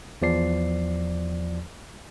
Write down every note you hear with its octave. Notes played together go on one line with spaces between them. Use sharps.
E2 F3 D5 C7